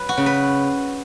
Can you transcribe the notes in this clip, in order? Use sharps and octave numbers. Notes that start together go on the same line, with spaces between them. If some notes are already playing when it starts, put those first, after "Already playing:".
Already playing: F#3 B4
F#4
C#3
B4